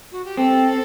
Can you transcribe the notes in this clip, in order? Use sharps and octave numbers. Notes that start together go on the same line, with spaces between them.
F#4
G4
C4 A4